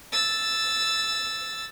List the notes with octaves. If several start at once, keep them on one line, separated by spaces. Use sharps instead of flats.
E6 A6